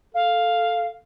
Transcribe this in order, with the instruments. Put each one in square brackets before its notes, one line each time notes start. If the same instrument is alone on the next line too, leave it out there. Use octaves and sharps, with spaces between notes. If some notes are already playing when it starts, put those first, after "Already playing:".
[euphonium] A4 [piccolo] F5